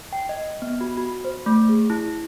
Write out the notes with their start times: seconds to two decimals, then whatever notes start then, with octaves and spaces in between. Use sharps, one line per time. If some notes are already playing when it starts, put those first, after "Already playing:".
0.13 G5
0.29 D#5
0.62 B3
0.81 F#4
0.97 F#4
1.24 C5
1.46 A3
1.69 G#4
1.90 E4